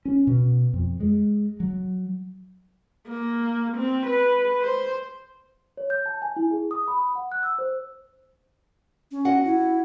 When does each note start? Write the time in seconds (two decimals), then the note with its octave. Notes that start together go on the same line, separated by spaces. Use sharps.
0.05 C#4
0.27 B2
0.73 F2
1.00 G#3
1.60 F#3
3.08 A#3
3.77 C4
4.06 B4
4.61 C5
5.77 C#5
5.90 G6
6.06 A5
6.22 G#5
6.36 E4
6.51 G#4
6.71 D#6
6.88 B5
7.15 F#5
7.32 F#6
7.43 E6
7.59 C5
9.11 C#4
9.25 F#4 D#5 F#5
9.45 E4